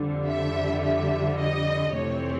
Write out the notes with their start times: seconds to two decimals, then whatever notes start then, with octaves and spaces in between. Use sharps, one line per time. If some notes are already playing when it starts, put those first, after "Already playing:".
Already playing: F2 D3 G3
0.28 E5
0.83 E5
1.39 D#5
1.95 F2 C3 E3 A3 C4 C#5